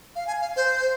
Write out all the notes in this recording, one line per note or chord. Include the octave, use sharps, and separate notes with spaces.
F5
G#5
F5
C5